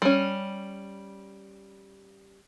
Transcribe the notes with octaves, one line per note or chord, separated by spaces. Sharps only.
G3 C#4